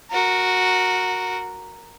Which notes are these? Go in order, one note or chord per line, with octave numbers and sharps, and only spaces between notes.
F#4 A#4